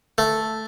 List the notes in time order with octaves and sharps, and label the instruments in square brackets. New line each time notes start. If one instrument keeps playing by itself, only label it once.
[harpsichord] A3